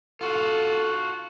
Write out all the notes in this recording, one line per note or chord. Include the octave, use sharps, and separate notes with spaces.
F4 F#4 A4